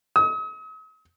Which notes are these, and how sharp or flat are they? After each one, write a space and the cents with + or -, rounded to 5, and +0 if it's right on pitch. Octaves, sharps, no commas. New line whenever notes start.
D#6 +45